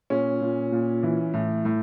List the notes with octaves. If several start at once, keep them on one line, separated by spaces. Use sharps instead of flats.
A#2 C#4
A#2
A#2
E3
A2
A2